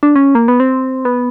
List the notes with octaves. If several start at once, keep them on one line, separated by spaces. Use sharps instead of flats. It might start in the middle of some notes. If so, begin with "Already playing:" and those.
D4
C#4
A#3
B3
C4
B3